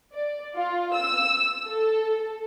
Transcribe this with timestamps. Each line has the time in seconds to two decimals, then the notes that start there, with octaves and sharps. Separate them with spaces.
0.12 D5
0.56 F4
0.94 E6
1.67 A4